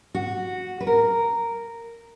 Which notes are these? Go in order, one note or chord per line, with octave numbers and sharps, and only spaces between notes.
F#4
B4
A#4